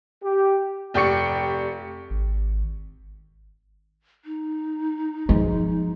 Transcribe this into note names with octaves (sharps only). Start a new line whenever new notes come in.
G4
F1 G4 D5 C#6 C#7
G#1
D#4
F3 G#3